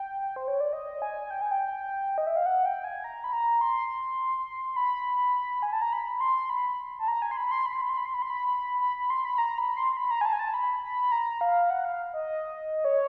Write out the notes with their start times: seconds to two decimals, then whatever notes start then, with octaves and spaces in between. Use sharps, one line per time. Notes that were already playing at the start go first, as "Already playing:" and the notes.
Already playing: G5
0.36 C5
0.48 C#5
0.60 D5
0.73 D#5
1.02 G#5
1.30 G5
1.42 G#5
1.51 G5
2.18 D#5
2.27 E5
2.37 F5
2.46 F#5
2.66 G5
2.84 G#5
3.04 A#5
3.24 B5
3.33 A#5
3.61 C6
4.69 C6
4.76 B5
5.63 G#5
5.73 A5
5.82 A#5
5.93 B5
6.15 B5
6.21 C6
6.50 B5
6.99 A5
7.08 A#5
7.22 G#5
7.31 C6
7.37 B5
7.51 C6
7.66 B5
7.73 C6
7.81 B5
7.89 C6
7.97 B5
8.06 C6
8.14 B5
8.22 C6
8.30 B5
8.80 B5
8.96 B5
9.10 C6
9.25 B5
9.38 A#5
9.58 B5
9.77 C6
9.92 C6
9.97 B5
10.11 A#5
10.21 G#5
10.26 A5
10.33 G#5
10.39 A5
10.54 B5
10.83 B5
11.12 A#5
11.41 F5
11.70 F#5
11.85 F5
12.13 D#5
12.85 C#5